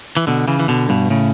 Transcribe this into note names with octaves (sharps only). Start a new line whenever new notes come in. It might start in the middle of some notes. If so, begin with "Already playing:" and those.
E3
B2 D3
C#3 E3
E3
B2 D3
G2 B2
A2 C#3